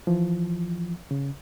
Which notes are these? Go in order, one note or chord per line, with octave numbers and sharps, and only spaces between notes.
E3 F3
C#3